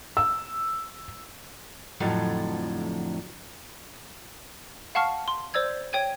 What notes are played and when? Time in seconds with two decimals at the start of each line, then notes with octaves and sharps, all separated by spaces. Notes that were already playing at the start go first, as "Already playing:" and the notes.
0.17 E6
2.00 F2 A2 D3 F3 F#3 A4
4.95 F5 F#5 A5 C#6 F6 C7
5.28 C6
5.54 C5 D5 E6 G#6
5.93 C#5 G5 G#6 D#7